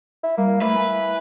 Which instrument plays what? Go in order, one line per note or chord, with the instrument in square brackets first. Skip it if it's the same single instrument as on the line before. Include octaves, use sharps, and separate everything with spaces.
[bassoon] E4
[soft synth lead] G3 [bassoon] A#3
[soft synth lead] A3 [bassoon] E4 [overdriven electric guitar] B4
[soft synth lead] G#5